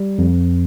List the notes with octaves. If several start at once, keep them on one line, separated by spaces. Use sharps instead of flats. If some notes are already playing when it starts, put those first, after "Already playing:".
Already playing: G3
F2